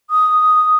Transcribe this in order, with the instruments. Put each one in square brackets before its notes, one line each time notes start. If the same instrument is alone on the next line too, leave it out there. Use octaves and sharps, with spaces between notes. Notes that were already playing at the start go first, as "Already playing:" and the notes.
[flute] D#6